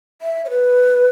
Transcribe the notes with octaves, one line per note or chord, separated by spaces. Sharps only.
E5
C#5
B4